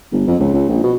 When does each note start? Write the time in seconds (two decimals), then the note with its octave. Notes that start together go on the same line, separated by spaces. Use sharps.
0.12 G1
0.27 F2
0.39 C#2
0.54 C#2
0.69 A#1
0.83 B2